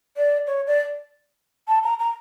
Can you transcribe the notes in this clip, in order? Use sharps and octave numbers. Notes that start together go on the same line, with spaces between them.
D5
C#5
D5
A5
A#5
A#5